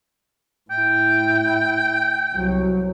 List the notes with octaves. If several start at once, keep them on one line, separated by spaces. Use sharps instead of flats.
A2 E4 G5
C2 F#3